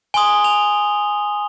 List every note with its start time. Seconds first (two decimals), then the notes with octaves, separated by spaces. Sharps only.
0.14 G#5 C6 D#6 G7
0.44 F7